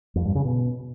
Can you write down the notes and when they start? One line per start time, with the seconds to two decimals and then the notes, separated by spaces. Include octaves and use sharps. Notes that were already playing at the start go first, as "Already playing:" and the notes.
0.16 F2
0.25 G2
0.35 C#3
0.45 B2